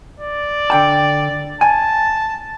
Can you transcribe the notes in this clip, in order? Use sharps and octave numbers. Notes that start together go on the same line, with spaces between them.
D5
D3 G5 A5
G#5 A5